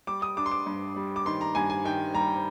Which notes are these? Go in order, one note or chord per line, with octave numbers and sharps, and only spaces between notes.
G3 D6
D#6
D4 D6
C6
D6
G2
G3
D6
D#3 C6
A#5
G2 G#5
G#5
D#3 G5
G3 A#5